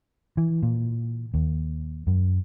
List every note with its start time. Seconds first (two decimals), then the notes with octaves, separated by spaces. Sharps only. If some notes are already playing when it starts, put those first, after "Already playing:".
0.37 E3
0.63 A#2
1.34 D#2
2.07 F#2